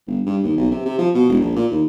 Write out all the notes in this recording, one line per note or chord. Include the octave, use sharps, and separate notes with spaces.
G1
G2
D#2
B1
C3
C3
F3
B2
E1
A#1
A#2
D#2